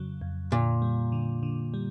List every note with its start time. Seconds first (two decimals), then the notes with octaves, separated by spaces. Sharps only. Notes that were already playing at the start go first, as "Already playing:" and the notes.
Already playing: F2 C#3 F#3
0.21 F2
0.52 A#2 D3
0.82 G3
1.12 D3
1.43 D3
1.74 G3